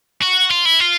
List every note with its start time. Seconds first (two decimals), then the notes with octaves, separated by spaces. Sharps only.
0.22 F#4
0.51 F4
0.65 E4
0.80 F4